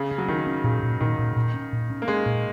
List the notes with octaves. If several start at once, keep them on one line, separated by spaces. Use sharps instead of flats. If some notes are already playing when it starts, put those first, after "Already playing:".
Already playing: C#3
C#4
F#3
D#3 C#4
C#4
A#2 C#3
A#2
A#2 D#3
A#2
A#2
C#4
A#2
C#4
A#3
G#3 C#4
A#2